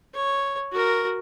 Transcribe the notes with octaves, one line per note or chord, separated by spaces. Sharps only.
C#5
F#4 A#4